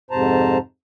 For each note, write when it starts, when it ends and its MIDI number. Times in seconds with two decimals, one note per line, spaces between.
0.11 0.58 41
0.11 0.58 44
0.11 0.58 48
0.11 0.58 72
0.11 0.58 81
0.11 0.58 82